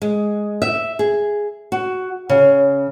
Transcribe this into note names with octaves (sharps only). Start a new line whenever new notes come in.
G#3
E5
G#4
F#4
C#3